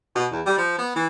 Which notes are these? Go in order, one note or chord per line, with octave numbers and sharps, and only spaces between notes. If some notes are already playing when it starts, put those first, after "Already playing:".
B2
E2
G3
F3
B3
E3